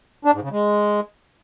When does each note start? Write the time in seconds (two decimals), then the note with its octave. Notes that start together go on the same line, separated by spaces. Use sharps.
0.25 D4
0.34 G#2
0.43 C#3
0.52 G#3